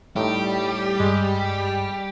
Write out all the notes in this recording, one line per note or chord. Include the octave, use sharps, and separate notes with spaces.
A2 G3 D#4 G4
G2 G#3